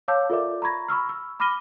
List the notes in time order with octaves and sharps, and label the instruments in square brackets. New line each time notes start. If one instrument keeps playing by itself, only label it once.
[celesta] C#5 F5 A5 D6 E6 G6
F4 A4 A#4 D5 E5 D6
A#5 B5 C#6 G#6 A#6
B5 C#6 E6 F6
E6
B5 D6 F6 A#6 D#7 G7